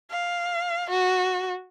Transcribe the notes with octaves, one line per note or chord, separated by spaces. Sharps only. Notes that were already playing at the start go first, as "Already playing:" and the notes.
F5
F#4